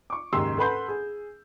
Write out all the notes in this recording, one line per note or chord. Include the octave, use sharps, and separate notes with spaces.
C#6 D6
F#1 D#2 G#2 G4 C6 E6
A4 B4 F#5 B5 C6 G6
G#4